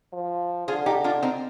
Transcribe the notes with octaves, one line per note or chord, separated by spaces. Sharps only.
F3
D3 F4 G#4
D#4 G4
D4 F4
C4 D#4